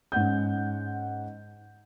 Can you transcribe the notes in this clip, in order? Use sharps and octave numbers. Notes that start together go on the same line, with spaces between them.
G#2 C#4 F#5 G6